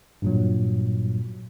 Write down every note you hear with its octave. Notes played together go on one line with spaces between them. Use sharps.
G2 A#2 F#3